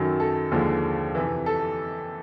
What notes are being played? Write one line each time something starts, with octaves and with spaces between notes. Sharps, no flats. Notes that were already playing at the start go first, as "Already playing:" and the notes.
Already playing: F#2 D#3 F#3 A4
A4
D#2 D3 F3 G#3
F2 C3 E3
A4